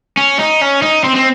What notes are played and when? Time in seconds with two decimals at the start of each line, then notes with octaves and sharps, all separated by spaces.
0.17 C#4
0.39 D#4
0.61 C#4
0.82 D#4
1.04 C4
1.15 C4